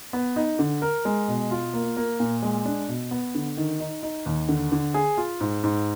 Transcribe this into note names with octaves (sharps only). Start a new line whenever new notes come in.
B3
D#4
D3
A#4
G#3
B2
F4
A#3
A#3
A#2
G#3
D4
B2
B3
D3
D#3
D#4
D#4
D#2
D3
D3
G#4
F4
G#2
G#2